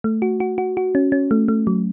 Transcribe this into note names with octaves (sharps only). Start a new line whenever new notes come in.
A3
F#4
F#4
F#4
F#4
C#4
C#4
A3
A3
F#3